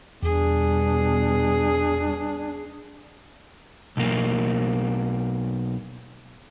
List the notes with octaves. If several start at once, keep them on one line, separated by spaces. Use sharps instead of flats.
E2 B2 G3 D4 G#4
B1 A#3